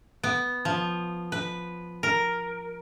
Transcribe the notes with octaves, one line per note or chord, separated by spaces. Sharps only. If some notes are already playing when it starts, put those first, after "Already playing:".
B3
F3
B4
A#4